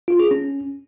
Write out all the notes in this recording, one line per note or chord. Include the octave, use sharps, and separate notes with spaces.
F4
G#4
C#4